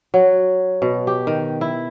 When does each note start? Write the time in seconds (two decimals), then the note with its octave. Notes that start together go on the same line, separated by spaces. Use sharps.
0.14 F#3
0.82 B2
1.07 G4
1.27 D#3
1.61 E4